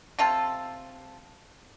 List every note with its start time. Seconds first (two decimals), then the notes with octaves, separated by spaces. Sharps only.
0.19 C3 F4 A4